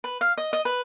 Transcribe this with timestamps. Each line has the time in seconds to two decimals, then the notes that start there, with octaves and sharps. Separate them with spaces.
0.04 B4
0.21 F5
0.38 D#5
0.53 D#5
0.65 B4